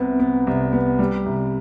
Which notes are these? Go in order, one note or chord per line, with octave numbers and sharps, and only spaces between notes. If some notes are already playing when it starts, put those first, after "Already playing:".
Already playing: C2 C3 B3
B3
C2
B3
G3
C2